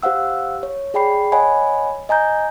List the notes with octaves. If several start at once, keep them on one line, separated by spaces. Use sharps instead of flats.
G4 C5 F5 F#5 E6
C#5
G#4 D5 G5 B5 C7
C#5 D#5 F#5 G#5 B5
D#5 G#5 A#5 G6